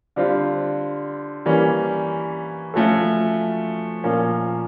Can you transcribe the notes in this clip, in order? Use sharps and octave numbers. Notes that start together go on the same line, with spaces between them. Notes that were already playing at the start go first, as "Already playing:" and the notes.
D3 G3 C4 F4
E3 G3 A#3 C#4
F3 A3 C#4 F#4 A4
A#2 F3 A#3 C#4